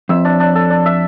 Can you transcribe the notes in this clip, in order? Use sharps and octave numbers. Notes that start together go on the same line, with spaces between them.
F2 E5
D4
D4
A4
D4
E5